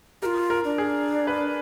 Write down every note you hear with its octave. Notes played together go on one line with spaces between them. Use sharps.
F4 G4 A#4
A#4
D4
G#4
B4